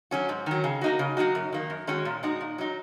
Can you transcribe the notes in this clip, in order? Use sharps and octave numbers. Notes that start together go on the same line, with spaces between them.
F#3 C#4 F#4
G#2
D#3 F#3
C#3
A#3 D#4 F#4
C#3
F#3 A#3 D#4 F#4
F#2
D#3 A#3
F#2
D#3 G#3 C#4 F#4
A#2
G#3 D#4 F#4
A#2
F#3 D#4